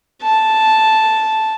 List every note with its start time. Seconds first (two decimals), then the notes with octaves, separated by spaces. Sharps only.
0.22 A5